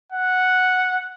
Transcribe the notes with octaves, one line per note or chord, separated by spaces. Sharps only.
F#5